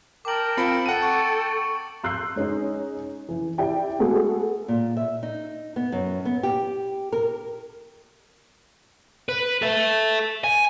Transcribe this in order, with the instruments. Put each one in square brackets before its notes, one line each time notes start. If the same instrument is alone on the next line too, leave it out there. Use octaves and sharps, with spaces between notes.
[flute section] A#4 G5 A5 [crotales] D6 F#7
[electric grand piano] C4 F4 B5 [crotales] C#7 D7 F#7
[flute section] A4 G5 A5 [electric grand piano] F#5 D#7
[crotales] C#6
[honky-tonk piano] C6 E6 F#6 G6 C7
G#3 C#4 D#4
E3
E4 G4 D5 E5 G5
G#3 A3 B3 F#4 G#4 A4
[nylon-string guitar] A#2
E5
D#4
B3
F#2
B3
G4
A#4
[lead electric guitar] B4
A4 E5
G#5